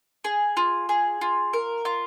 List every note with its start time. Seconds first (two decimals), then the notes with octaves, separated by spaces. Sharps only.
0.24 G#4
0.57 F4
0.89 G#4
1.21 F4
1.53 A#4
1.85 F4